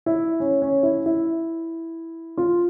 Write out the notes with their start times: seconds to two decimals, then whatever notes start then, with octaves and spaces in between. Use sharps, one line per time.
0.06 E4
0.40 C#4
0.62 C#4
0.83 E4
1.06 E4
2.37 F4